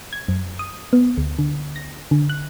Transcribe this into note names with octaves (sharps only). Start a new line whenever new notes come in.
G#6
F#2
D#6
B3
D2
D3
A#6
D3
F#6